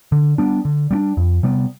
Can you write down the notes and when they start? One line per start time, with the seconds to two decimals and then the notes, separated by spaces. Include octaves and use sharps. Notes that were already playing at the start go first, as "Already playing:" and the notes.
0.12 D3
0.38 G3 B3 D4
0.65 D3
0.91 G3 B3 D4
1.17 F2
1.43 C3 G3 B3